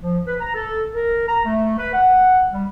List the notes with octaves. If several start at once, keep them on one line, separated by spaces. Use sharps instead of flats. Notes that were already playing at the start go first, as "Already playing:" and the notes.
F3
B4
A#5
A4
A#4
A#5
A3
B4
F#5
G3